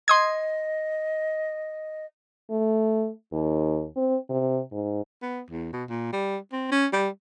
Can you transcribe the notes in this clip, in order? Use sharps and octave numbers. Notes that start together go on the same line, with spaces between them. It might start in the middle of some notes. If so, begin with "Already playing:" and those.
D#5 C6 D#6 G#6
A3
D#2
C4
C3
G#2
B3
E2
B2
A#2
G3
C4
C#4
G3